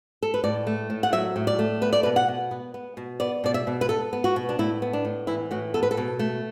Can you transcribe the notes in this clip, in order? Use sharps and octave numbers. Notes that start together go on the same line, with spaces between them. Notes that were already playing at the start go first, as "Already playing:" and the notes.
A4
B4
A2 D5
A3
A2
F#5
F#3 E5
A2
D5
A3
B3 B4
D5
B2 B4
F#5
B2
B3
B3
B2
B3 D5
B2 D5
E5
B2
B4
B3 A4
B3
F#4
B2
D4
A2 E4
B3
D4
A2
E3 E4
A2 F#4
B3 A4
B4
A4
B2
A3